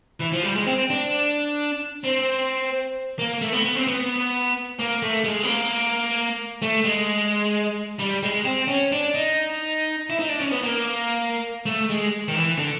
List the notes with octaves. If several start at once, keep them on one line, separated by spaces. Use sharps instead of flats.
E3
F3
G3
G#3
C4
D4
C4
A#3
A3
B3
B3
C4
B3
A#3
A3
G#3
B3
A#3
A3
G#3
G3
G#3
C4
C#4
D4
D#4
E4
D#4
D4
C#4
B3
A#3
A3
G#3
D#3
E3
D3